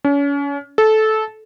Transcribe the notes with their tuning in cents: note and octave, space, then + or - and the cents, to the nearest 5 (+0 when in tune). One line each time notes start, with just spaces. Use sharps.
C#4 +35
A4 -15